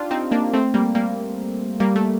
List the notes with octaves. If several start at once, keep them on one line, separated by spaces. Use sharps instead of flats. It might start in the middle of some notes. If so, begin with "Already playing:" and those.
Already playing: D4 D#4 F4 G4
C4 D#4
A#3 D4
A3 C4
G3 A#3
G3 A#3
G3 A#3
A3